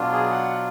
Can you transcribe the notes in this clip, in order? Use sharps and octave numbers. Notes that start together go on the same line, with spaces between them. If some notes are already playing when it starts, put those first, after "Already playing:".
Already playing: B2 F#3 D4 F4
G#4
F#5